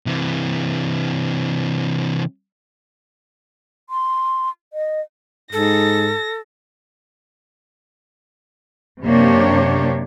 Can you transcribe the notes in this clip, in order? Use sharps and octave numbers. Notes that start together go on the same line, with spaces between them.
C3 E3
C6
D#5
G#2 A4 A#6
F#2 C3 A#3 D4 G4 C#5